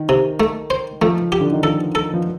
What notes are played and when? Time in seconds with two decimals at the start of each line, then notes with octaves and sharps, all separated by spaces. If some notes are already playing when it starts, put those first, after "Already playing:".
Already playing: D#3
0.09 C3
0.40 A3
0.70 C5
1.02 F3 A3
1.32 G4
1.41 D3
1.52 D#3
1.63 F3 A4
1.95 A4
2.14 F3